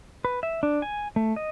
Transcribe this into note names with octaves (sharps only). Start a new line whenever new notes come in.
B4
E5
D4
G#5
A3
D#5